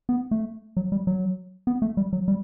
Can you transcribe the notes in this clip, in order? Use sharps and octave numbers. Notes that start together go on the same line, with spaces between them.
B3
A3
F#3
G3
F#3
B3
A3
G3
F#3
G3